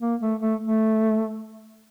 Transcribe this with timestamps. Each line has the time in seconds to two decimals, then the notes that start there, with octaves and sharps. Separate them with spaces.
0.01 A#3
0.21 A3
0.41 A3
0.61 A3